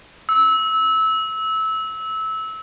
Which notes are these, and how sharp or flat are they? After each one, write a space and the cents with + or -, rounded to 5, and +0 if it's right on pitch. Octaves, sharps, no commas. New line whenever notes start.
E6 -20